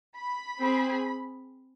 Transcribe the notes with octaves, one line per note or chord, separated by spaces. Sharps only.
B5
C4 G#4